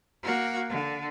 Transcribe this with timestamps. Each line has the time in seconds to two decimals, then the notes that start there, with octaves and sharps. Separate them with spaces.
0.23 A#3 F#4
0.69 D3